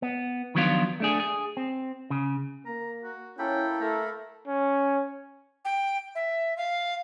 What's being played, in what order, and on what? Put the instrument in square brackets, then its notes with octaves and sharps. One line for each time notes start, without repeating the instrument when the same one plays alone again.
[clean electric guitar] B3
D#3 F3 F#3 B3 D4 F4
A3 D4 G#4
G#4
C4
C#3
[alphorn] A#3 [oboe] A#5
[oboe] F#4
[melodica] A#3 A4 B5 [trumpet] C#4 [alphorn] E4 [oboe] G5
[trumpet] A3 [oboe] A#4
[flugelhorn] C#4
[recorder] G5
E5
F5